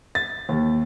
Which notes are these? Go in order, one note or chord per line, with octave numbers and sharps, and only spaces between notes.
A6
D#2